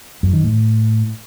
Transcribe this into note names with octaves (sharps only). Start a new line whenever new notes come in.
F#2
D#3
A2